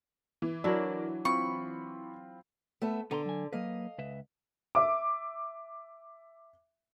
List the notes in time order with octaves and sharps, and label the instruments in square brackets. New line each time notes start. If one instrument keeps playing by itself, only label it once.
[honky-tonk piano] E3
[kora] F#3 D4 E4 [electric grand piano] A#4 C#5 D5
[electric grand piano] C4 F4 B5 [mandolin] C#6
[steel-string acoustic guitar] A3 B3 E5
[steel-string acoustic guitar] D3 [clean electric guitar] B3 A#5 C6
[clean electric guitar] F#3 G#5
[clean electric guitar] F#3 A#3 B4 [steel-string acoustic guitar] D#5 F5
[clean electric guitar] C#2 B4 E5
[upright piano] E5 D6